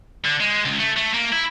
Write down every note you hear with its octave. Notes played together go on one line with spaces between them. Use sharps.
D3
G#3
C#2
A3
A3
A#3
E4